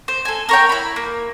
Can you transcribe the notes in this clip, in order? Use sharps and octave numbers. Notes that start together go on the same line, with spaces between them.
C5
A4 G#5
A#4 C#5 G5
E4 B5
A#3